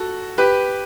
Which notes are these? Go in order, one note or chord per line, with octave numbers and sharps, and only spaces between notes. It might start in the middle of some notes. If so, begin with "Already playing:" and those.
Already playing: F#4 A4
G4 B4